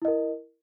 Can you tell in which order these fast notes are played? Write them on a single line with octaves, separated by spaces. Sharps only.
E4 D#5 A#4